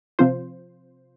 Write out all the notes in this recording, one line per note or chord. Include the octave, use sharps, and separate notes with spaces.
C3 F3 C4 F4 C5